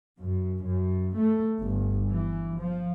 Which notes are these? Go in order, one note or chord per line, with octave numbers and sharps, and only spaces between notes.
F#2
F#2
A3
G1
E3
F3